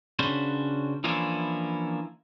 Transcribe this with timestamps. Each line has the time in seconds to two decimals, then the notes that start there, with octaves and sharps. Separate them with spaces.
0.19 C#3 C#4 D4 F#4 B4 C5
1.04 E3 F3 A#3 C#4 D4 E4